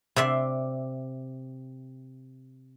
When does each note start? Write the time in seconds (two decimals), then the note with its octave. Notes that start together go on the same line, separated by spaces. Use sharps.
0.16 C3 D5 E5 C6